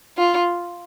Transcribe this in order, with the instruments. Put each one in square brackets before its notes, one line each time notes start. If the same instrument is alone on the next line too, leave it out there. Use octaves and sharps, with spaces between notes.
[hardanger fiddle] F4